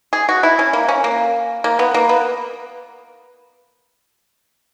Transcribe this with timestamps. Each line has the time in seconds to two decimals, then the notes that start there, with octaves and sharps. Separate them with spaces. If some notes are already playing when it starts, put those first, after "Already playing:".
0.13 G#4
0.29 F#4
0.43 E4
0.59 C#4
0.73 A#3
0.89 C#4
1.04 A#3
1.64 A#3
1.79 B3
1.94 A#3
2.09 B3